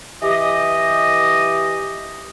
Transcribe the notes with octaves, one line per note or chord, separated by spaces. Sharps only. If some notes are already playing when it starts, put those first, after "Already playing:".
E3 G4 D#5